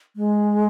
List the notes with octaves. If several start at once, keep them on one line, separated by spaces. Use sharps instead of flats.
G#3